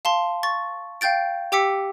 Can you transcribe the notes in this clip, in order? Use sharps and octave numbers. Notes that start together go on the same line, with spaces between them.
F5 A5 C6
C#6 A6
F5 G5 G6 A6 D7
G4 G5 D6 E6 B6 C#7